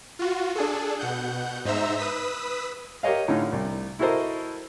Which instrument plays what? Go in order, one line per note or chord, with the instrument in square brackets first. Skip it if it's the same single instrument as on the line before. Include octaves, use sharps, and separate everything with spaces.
[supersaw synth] F4 F#4
D4 G#4 A4
B2 F#5 G6
G#2 D#4 C5 E5 A#5 E6
B4 D#6 E6 B6
[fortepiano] G4 A#4 C#5 D#5 F5
A2 D3 C#4 D#4 F4
C2
E4 F#4 A4 A#4 C5 D#5